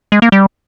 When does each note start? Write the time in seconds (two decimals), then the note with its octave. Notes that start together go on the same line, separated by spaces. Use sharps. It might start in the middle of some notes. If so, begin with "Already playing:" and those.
0.12 G#3
0.22 A#3
0.32 G3